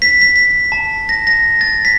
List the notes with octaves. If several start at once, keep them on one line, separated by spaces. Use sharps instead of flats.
B6
B6
B6
A5
A#6
A#6
A6
B6